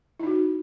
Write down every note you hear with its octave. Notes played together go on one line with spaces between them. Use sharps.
D#4 E4 F#4